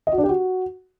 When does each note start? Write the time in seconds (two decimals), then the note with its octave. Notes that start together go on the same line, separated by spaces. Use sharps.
0.07 D#5
0.12 F#4
0.18 D4
0.23 G4
0.29 F#4